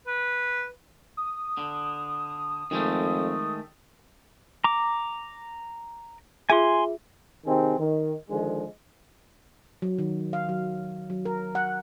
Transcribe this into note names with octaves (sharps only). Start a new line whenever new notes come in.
B4
D#6
D3
F2 D#3 G#3 A3
A#5 D6
F4 G#4 E5 G#5 C6
C3 D#3 C4 D#4 G#4
D#3
D3 D#3 F3 G#3
F#3
D#3
F5
F#3
F#3
A#4
F#5